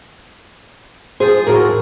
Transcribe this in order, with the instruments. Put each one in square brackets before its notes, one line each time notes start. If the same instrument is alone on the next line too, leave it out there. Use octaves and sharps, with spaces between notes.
[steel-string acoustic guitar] F3 G#4 [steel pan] C5
[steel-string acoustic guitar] E2 A2 [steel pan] F#4 A#4